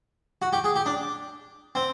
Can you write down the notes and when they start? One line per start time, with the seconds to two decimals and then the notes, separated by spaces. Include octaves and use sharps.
0.42 F#4
0.53 G4
0.64 G#4
0.76 G4
0.86 D4
1.75 C4